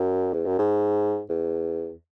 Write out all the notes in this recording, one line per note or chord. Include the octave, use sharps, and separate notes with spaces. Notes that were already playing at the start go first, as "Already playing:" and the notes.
Already playing: F#2
E2
F#2
G#2
E2